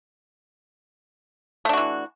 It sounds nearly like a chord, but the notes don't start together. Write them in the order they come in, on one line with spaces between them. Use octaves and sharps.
A3 D4 F#4 E3